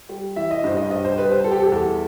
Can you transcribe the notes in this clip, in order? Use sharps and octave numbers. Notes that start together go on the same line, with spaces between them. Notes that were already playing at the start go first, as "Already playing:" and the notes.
G3
E3 E5
D#5
G2 C5
D#5
G2 D#5
C5
G3 B4
C5
G3 A4
G4
A4
E2